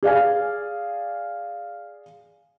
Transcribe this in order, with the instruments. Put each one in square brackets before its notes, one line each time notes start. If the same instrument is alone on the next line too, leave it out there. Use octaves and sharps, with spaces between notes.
[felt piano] G#4 D5 F5 G#5